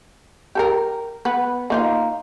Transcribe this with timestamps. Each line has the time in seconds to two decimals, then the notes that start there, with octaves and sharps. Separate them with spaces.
0.55 G4 A4 A#4
1.25 B3 B4
1.70 A#3 D#4 F4